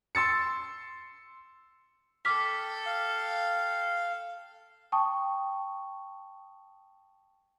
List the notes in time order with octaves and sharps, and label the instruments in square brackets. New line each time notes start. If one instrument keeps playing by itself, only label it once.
[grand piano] C6 E6 A6 C#7
[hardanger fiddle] A4 G5 [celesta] D6 F6 B6
[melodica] F5
[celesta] G5 A5 C#6 D#6